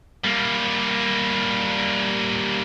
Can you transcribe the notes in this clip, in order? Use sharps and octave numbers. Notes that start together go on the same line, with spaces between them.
G3 A#3